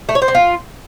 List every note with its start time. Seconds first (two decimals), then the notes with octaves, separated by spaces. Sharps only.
0.09 A3
0.15 C#5
0.22 C5
0.28 C4
0.35 F4